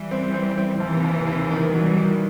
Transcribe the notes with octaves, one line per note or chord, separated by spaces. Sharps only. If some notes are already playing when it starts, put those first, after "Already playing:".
Already playing: E3 G3
C4
C4
C4
D#2 C3 E3
D#2
D#2
D#3
E3 F#3 G3
D#3